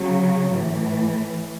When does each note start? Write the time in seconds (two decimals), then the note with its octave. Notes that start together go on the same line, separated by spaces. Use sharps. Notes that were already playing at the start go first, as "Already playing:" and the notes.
Already playing: C#3 F#3
0.49 A2 E3